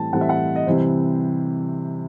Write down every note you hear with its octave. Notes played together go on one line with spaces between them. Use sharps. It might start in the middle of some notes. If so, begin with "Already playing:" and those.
Already playing: A2 E3 G3 C4 G5 A5
A2 E3 G3 C4 F#5
E5
F#5
D#5
C3 E3 G3 C5